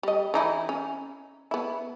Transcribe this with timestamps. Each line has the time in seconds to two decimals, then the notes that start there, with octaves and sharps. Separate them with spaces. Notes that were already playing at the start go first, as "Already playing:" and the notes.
0.03 G3 D#5
0.34 E3 D#4 E4
0.69 C#4
1.51 B3 E4